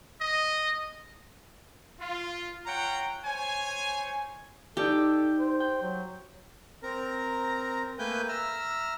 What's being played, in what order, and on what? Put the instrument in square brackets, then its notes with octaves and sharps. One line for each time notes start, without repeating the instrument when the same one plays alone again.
[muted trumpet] D#5
[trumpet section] F4
F4 C#5 F#5 G5 A#5
C5 C#5 G#5
[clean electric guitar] D#4 D5 G5 [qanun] G4 [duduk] A4
[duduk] C5
[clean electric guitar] G5
[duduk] F#3
[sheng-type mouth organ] C4 A#4 A#5
A3 A#3 B4 G5 G#5 G6
E5 A#5 E6 F6